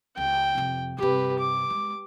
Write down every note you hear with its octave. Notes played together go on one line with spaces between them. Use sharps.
C#2 G5
F2 C3
G2 C3 G4 B4
D6
G#3